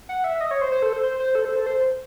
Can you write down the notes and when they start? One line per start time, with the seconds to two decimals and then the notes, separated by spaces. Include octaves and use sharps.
0.09 F#5
0.24 E5
0.41 D#5
0.51 C#5
0.61 C5
0.72 C5
0.82 A4
0.93 C5
1.03 C5
1.20 C5
1.35 A4
1.45 C5
1.56 A4
1.66 C5